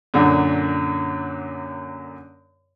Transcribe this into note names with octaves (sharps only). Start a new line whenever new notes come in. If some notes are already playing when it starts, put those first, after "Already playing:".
F#2 A#2 D3